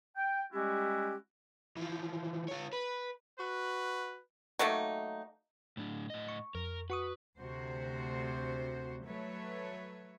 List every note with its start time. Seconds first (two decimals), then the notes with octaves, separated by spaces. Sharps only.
0.16 G5
0.52 G3 G#3 C#4 E4 F#4 G4
1.77 E3 F3
2.48 F4 C#5
2.73 B4
3.40 F#4 B4
4.59 F#3 A3 A#3 D#4
5.77 A2 D4
6.10 A2 D#5
6.28 C#6
6.55 F2 A#4
6.90 F#4 B4 C#6 D#6
7.39 D2 C3 F#4 C5
9.06 F#3 A3 B4 C#5 E5